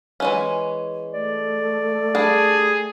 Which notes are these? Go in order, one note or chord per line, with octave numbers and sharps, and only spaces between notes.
E3 G#3 C#4
A3 D5
G3 D4 G#4